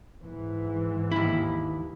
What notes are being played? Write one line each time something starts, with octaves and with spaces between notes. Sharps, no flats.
G#2 E3
D#2 E4